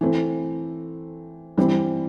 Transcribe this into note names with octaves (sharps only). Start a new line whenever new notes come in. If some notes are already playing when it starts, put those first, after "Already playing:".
E3 A3 C4
E3 G3 C4